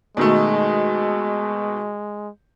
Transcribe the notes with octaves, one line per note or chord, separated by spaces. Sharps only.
B2 D#3 G#3 A3